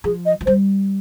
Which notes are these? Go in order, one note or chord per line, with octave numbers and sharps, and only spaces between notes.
F3 G#4
D#5
F3
G3 C5